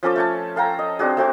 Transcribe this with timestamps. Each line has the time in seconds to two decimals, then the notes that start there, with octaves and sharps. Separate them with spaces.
0.03 F3 C#4 A4 D6
0.16 A3 C#5 A5
0.56 A4 F5 G5 A#5
0.79 D#5
0.99 C4 D4 F#4 G#4
1.17 A3 C4 F#4